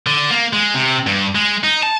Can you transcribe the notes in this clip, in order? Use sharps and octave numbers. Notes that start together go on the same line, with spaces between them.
D3
A#3
G#3
C3
G2
G#3
D#4
A5